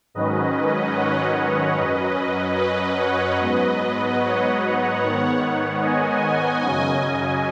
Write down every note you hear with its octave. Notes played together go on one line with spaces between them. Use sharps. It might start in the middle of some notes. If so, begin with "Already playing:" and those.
G#2 D#3 F#3 C#4 B4 D#5
C#5 F#5
F#2 F#3 C#4 B4 D#5
B4 D#5
C#5 F#5
G#2 F#3 B3 B4 D#5
C#5 F#5
G#2 D#3 B3
D#5 G#5
F#2 C#3 F#3 C#4